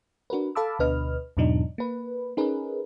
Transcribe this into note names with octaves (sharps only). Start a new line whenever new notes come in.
D4 F#4 A#4 B4
A4 F5 A5 B5 D6 E6
D2 B2 D4 B4 D#5 F6
E2 G#2 B2 F#3 D4 D#4
A#3 B4
C#4 D#4 G#4 A#4 B4